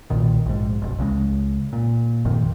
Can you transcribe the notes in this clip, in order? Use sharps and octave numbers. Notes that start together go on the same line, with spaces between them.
B1 A#2 D#3
A#1 G#2
F#1 B1
C#2 C#3 G3 G#3
A#2
G1 F2 A#2 D#3